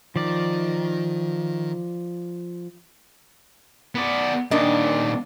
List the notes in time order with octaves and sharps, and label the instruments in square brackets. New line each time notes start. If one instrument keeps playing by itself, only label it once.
[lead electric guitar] D#3 [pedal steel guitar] F3 D5
[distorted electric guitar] B3 D5
[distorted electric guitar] A#2 D#3 [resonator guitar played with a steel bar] D4 D#5